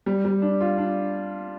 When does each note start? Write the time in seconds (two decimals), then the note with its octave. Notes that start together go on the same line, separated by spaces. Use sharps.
0.06 G3
0.25 G3
0.42 D4
0.61 F4
0.78 D4